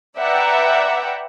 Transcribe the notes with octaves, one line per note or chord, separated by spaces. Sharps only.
B4 D5 E5 F#5 G5 A#5